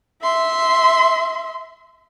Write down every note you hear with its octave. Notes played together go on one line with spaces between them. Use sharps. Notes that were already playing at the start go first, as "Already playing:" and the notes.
E5 C6